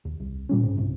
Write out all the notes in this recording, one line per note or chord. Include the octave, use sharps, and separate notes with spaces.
D#2
C2
A#2 G3 C#4
G#2
G1 C2